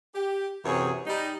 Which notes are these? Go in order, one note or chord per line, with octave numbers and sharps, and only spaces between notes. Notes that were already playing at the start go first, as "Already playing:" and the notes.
G4
F#2 C3 E3 G#4 C#5
G3 D#4